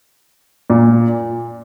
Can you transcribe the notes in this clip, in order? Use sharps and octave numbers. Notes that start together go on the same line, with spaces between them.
A#2